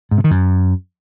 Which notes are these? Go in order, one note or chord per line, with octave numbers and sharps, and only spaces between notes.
G#2
C3
D#3
F#2